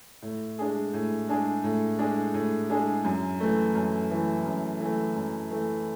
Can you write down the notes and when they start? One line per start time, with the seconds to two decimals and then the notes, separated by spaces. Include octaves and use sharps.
0.22 A2
0.59 G#3 D4 G#4
0.94 A2
1.29 G#3 D4 G#4
1.64 A2
1.99 G#3 D4 G#4
2.34 A2
2.70 G#3 D4 G#4
3.05 F#2
3.40 E3 A3
3.75 F#2
4.11 E3 A3
4.46 F#2
4.80 E3
4.85 A3
5.16 F#2
5.51 E3 A3